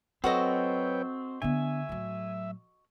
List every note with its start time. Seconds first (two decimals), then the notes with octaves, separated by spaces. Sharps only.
0.24 F#3 C4 F#4 A4 B4 C#5 D#5 G5
1.42 D3 B3 E5 G#5
1.89 A2 F#3